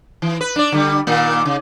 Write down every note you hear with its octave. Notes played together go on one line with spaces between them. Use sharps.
E3
B4
D4 D5
D3 G3
A#2 D#3 A#3
C#3